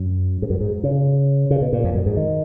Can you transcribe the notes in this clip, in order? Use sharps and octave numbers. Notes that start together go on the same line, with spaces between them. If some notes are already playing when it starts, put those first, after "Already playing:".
Already playing: F#2
G#2
F#2
G#2
C#3
C#3
B2
A#2
F2
F#2
G#2
D#3